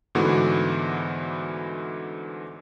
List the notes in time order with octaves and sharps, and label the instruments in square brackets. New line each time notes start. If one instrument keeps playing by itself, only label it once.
[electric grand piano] G#2 D3 E3 A3 B3 F#4